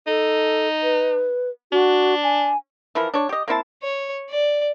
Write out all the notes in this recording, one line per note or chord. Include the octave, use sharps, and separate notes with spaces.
D#4 A4
B4
D4 F#4
G#5
E3 F3 E4 A#4
D4 C#5
G4 D#5
A#3 C4 E4 A5
C#5
D5